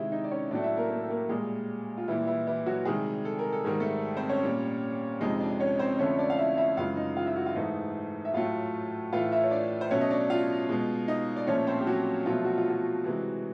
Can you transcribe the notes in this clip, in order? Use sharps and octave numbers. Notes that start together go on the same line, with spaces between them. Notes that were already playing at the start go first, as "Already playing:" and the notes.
Already playing: C3 D#3 G#3 E4 E5
D#4 D#5
D5
C#4 C#5
A2 F#3 A3 D4 D5
E4 E5
A#3 A#4
A#3 A#4
A4
A#3 A#4
A#2 G3 G#3 G#4
F4
A#2 E3 G3 E4
E3 E4
E3 E4
F#3 F#4
C3 D#3 G3 G#3 G#4
A4
A#4
A4
G#2 D#3 G3 A#4
A3 A4
C4 C5
C#4 C#5
A#2 G3
F2 C3 F3 G#3 D#4 D#5
D4 D5
C#4 C#5
C4 C5
F2 D3 F3 A3 C#4 C#5
D4 D5
F5
E4 E5
E4 E5
F#2 C#3 E3 G#3 F4 F5
D#4 D#5
F4 F5
E4 E5
F#4 F#5
F4 F5
G#2 E3 A3 D#4 D#5
E5
A2 F#3 A3 F4 F5
A2 E3 A3 F4 F5
E4 E5
C#5
D4 D5
C5
B2 F#3 A3 C#4 C#5
D#5
D4 D5
F4 F5
B2 G#3
D#4 D#5
D5
A#2 F3 A3 C#4 C#5
C4 C5
G4
F#3 F#4
B2 F3 F#3 A3 F4
F#4
F4
F#3 F#4
C3 E3 G#3